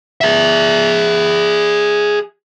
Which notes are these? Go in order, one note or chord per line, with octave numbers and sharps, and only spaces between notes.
G#4 E5